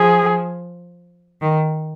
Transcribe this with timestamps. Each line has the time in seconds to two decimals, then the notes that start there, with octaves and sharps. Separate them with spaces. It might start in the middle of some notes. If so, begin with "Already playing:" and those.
Already playing: F3 G#4
1.42 D#3